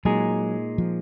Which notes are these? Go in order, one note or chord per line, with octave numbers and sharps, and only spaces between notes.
A#2 F#3 G#3 D#4 G#4
F3